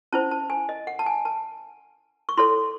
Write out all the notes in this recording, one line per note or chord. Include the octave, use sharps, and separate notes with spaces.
C#4 E4 C5 A5
A5
G#5
D#5
F#5
A5
G#5
A5
C#6
E4 A4 C#5 C6